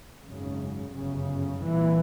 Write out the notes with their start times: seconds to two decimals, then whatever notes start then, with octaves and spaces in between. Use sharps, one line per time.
0.22 G#1 F#2 C#3
0.91 G1 F#2 C#3
1.60 C2 A#2 E3